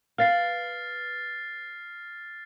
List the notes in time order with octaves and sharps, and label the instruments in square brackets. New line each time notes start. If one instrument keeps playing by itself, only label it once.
[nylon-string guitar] B4 F5 [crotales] F6 A6 C7